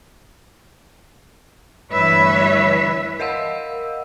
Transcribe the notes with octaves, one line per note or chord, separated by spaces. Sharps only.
D2 G2 E3 B4 C#5 E5
A#4 D#5 F5 F#5 E6